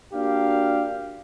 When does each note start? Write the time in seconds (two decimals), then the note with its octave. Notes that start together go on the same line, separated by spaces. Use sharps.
0.14 A#3 D4 F#4 G4 F5